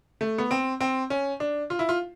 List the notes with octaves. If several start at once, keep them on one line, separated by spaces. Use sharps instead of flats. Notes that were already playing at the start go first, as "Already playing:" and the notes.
A3
B3
C4
C4
C#4
D4
F4
E4
F4